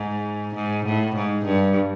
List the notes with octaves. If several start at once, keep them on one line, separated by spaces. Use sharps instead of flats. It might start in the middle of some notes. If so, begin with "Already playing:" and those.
Already playing: G#2
G#2
A2
G#2
G2